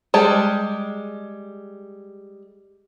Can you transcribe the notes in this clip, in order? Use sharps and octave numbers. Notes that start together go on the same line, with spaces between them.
G3 G#3 A5